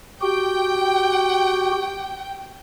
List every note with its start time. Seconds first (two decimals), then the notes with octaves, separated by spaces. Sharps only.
0.21 F#4 G4 G5